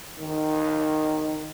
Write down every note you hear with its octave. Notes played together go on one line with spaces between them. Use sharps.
D#3